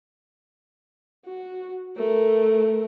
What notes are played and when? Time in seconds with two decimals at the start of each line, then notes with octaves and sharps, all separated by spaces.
1.26 F#4
1.97 A3 A#4